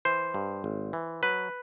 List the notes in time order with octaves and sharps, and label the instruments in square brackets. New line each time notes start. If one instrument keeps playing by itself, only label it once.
[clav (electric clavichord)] E3 C5
G2
G#1
E3
F#3 B4